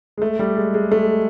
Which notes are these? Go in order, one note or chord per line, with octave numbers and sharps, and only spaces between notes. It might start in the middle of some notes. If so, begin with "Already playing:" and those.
G#3
A3
G3
G#3
G#3
A3